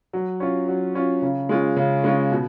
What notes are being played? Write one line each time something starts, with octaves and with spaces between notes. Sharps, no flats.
F#3
C#4 F4
F#3
C#4 F4
C#3
G#3 C#4 F4
C#3
G#3 C#4 F4
B2